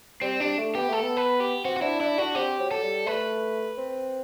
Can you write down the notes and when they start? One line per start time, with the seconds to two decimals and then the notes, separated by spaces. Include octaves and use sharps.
0.22 G3 C4
0.40 G3 D4
0.58 A3
0.75 B3 G4
0.89 A3 A4
1.02 B3
1.17 B4
1.40 G4
1.64 C4 F#4
1.77 F#4
1.82 D4 E4
2.00 D4 E4
2.18 D4 F#4
2.35 C4 G4
2.59 F#3
2.71 A4
2.83 G3
3.07 A3 B4
3.78 C4